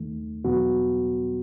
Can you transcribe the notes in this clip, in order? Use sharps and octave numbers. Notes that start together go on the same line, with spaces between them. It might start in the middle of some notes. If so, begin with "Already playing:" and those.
Already playing: D#2 D#3 A3
E2 B2 F#3 B3 F#4